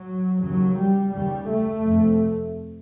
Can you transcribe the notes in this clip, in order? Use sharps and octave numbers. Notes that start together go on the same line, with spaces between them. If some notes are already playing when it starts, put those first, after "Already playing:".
Already playing: F#3
D#2 C#3 F#3
G3
D#2 C#3 G3
A3
F2 C3